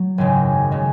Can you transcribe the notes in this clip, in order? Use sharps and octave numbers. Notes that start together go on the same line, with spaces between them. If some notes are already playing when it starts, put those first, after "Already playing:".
Already playing: F#3
G#1 F#2 C#3 G#3
C#3 G#3